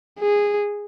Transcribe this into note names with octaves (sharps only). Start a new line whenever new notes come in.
G#4